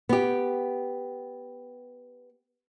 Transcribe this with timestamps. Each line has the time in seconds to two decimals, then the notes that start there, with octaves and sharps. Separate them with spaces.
0.09 B3 G4